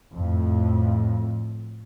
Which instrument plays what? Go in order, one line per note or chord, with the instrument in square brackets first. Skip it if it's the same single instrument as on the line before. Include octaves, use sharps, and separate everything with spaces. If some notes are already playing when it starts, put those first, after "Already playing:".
[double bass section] F2 A2